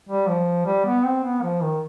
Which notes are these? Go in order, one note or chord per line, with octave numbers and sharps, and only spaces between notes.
G3
F3
G3
B3
C4
B3
F3
D#3